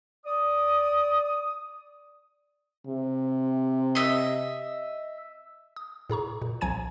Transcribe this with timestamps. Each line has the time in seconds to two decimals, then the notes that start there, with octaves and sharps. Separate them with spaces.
0.25 D5 D#6
2.87 C3
3.95 D#5 E5
5.76 D#6
6.10 A2 G#4 A#5 C#6
6.42 A#2
6.61 C2 F3 G#5 A#5 G#6 D#7